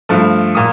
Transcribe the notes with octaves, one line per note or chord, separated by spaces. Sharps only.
G2 F3 A3
A#2 D#6